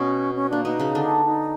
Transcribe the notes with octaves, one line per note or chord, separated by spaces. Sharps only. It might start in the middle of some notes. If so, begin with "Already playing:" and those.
Already playing: B2 B3 C#4
C#4
A#3 D4
B2 B3 D#4
C#3 C#4
D3 D4
D#4